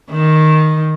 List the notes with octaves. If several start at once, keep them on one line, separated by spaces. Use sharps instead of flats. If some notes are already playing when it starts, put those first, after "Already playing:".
D#3